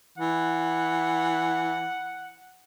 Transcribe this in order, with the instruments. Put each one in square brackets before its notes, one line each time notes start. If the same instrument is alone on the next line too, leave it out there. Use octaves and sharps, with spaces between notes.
[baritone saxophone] E3 [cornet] F#5